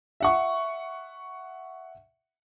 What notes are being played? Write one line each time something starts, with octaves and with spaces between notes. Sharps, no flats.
E5 F#5 C#6